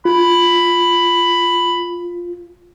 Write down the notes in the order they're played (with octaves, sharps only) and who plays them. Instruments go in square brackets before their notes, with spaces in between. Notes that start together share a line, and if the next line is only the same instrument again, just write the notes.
[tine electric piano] F4 [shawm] B5